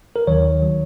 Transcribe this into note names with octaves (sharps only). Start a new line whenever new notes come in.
A#4
D#2 D#3 F#3 C#5
D#3 F#3